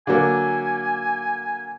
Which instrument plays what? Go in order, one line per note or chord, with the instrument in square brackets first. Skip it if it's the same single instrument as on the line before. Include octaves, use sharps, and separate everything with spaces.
[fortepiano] D3 F#3 A#3 [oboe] G#5